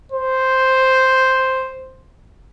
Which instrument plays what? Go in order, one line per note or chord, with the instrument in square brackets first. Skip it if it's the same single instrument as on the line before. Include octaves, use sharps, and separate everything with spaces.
[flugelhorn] C5